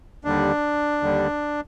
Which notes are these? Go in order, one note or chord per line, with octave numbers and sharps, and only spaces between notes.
D#2 D3 G3 D4
D#2 D3 G3